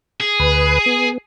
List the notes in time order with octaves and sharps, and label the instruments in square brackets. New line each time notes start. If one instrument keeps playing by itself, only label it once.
[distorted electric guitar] G#4
[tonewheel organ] D2 B4
B3